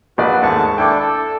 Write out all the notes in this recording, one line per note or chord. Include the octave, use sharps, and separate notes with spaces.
A#1 F#4 B4 D5
D#2 G#2 A3 A5 C#6
D4 E4 A4 G5 D6
A4